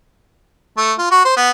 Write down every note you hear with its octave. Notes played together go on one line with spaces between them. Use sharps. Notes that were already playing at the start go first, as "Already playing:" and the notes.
A3
F4
F#4
C5
B3